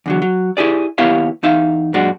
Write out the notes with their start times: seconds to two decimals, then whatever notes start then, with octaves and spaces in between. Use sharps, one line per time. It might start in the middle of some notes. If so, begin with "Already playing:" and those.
0.06 E2 D3 F#3
0.22 F#3
0.57 E4 G4 G#4 D5
0.98 D#2 B3 E4 G4 C#5 F5
1.43 E2 D#4 E5 F5
1.94 F#2 A#2 G#3 D4 F#4